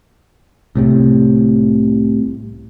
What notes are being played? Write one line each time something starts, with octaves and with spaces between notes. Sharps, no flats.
C2 A2 C3